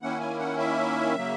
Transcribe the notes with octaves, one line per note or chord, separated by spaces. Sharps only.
D#3 A#3 C#4 E4 F#5
G#5
F#5
E5
C#3 F#3 A#3